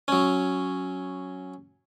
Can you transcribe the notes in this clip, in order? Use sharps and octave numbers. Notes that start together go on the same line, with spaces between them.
F#3 C#4